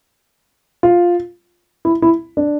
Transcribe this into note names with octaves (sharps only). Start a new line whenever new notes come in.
F4
E4
E4
D4